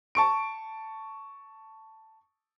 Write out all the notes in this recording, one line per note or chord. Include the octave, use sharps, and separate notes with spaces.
A5 C#6 D7